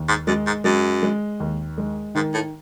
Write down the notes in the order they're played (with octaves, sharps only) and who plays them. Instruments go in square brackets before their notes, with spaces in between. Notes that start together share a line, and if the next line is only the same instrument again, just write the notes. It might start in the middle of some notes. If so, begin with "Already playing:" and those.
Already playing: [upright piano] D#2
[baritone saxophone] G#2
[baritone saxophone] F#2 [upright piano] G#3
[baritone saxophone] G#2
[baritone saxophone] F#2 [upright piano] G#3
[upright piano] G#3
D#2
G#3
[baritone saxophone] G#2 [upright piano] D#3
[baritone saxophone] A2